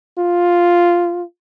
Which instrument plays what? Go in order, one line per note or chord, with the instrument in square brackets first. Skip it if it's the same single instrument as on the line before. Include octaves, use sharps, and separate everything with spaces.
[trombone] F4